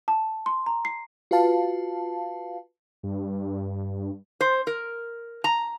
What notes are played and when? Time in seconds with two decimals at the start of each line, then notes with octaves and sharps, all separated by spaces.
0.08 A5
0.46 C6
0.66 A#5
0.85 C7
1.31 F4 F#4 B4 F5 A5
3.03 G2
4.41 C5
4.67 A#4
5.44 A#5